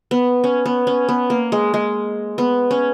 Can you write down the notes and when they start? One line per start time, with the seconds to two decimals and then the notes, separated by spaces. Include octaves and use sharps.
0.11 B3
0.44 C#4
0.66 B3
0.87 C#4
1.09 B3
1.30 A#3
1.52 G#3
1.74 G#3
2.38 B3
2.71 C#4